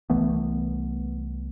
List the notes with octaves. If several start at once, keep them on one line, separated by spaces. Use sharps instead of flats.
C2 E3 A3 B3